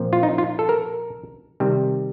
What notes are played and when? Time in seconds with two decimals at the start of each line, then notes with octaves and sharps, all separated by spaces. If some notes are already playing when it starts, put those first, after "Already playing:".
Already playing: A#2 F3 C4
0.13 F4
0.23 D#4
0.38 F4
0.59 A4
0.69 A#4
1.60 C3 D#3 G3 C4